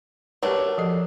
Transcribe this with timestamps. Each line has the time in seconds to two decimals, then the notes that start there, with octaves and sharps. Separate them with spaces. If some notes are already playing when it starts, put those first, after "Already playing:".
0.43 F#3 A3 D4 G4 A#4 B4
0.65 A#4
0.78 F3 A4 D#5